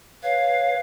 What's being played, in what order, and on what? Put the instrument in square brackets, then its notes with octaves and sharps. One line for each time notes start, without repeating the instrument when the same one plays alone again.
[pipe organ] B4 C#5 [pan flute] F5